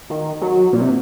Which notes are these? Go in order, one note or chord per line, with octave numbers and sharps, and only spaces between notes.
D#3
F#3
A#2
C3